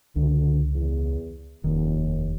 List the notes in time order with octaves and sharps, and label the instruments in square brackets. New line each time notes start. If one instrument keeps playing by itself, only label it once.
[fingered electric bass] C#2 [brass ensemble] D3
[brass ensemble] E2
[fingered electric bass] F1 D#3 [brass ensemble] D#2